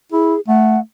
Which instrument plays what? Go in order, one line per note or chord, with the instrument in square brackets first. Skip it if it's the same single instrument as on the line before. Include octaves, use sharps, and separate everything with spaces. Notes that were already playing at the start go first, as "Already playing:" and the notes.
[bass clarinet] E4 [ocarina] G#4
[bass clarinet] A3 [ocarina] F#5